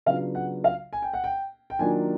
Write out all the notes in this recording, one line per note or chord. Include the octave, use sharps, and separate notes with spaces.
C#3 F#3 B3 D4 F4 F5
F#5
F5
G#5
G5
F#5
G5
G5
D#3 F#3 A#3 D4 F4 G#5